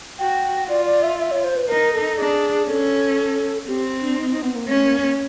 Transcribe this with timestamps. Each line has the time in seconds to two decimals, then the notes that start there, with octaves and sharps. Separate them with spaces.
0.19 F#4 G5
0.69 F4 D5
0.85 D5
1.03 E5
1.19 E5
1.31 C#5
1.44 C5
1.56 B4
1.68 D#4 A#4
1.94 A4
2.18 D4 G#4
2.68 C#4 A4
3.68 C4 G4
4.01 D4
4.18 D#4
4.30 D#4
4.42 B3
4.55 A#3
4.68 A3 C#4
4.85 A#3
5.01 A#3